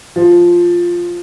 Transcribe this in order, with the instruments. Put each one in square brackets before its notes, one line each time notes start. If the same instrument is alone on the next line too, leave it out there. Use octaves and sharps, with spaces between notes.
[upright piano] F3